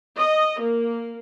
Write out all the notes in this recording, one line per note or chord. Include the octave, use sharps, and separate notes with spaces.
D#5
A#3